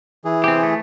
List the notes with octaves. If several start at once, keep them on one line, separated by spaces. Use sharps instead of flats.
E3 G#4
C4 G4
A3